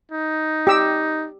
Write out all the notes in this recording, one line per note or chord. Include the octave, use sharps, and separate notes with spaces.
D#4
G4 E6